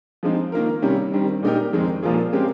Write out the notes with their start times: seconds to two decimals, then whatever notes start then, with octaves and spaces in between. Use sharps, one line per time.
0.23 F3 G#3 C4 D#4
0.52 D#3 A#3 F4 A#4
0.82 C3 D#3 G3 C#4
1.12 G2 D#3 G3 C4
1.43 A#2 G#3 D#4 G4 A#4
1.73 F2 D#3 G#3 C4
2.03 A#2 F3 A#3 F4 G#4
2.33 C#3 G#3 C4 G4 A#4